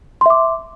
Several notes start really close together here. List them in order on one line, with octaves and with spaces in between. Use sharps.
C6 E5 D6